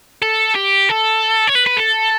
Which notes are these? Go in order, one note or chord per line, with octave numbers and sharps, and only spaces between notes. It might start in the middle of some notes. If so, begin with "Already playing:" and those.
A4
G4
A4
C#5
B4
B4
A4